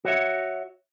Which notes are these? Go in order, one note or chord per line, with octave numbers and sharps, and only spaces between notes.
F#4 C#5 E5